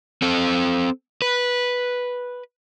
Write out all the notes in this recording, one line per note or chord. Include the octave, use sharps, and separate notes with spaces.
C4 A4
B4